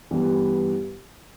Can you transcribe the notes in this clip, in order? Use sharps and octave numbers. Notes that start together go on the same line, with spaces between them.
G2 E3 G3 B3